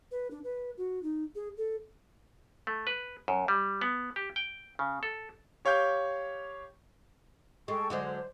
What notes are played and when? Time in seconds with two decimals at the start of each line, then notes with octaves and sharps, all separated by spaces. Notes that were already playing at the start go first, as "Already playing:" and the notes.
0.11 B4
0.31 D4
0.44 B4
0.78 F#4
1.03 D#4
1.35 G#4
1.57 A4
2.67 A3
2.87 B4
3.28 F#2
3.48 G3
3.82 B3
4.16 G4
4.36 G5
4.79 C#3
5.03 A4
5.65 G4 C#5 F5 G5 G6
7.68 G#3 A4 G5 C#6
7.90 D3 F#3 G#3 C5